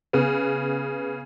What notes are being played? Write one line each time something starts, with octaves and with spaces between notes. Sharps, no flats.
C#3 B3